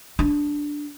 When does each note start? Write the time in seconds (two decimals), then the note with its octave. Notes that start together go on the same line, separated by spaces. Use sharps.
0.19 D4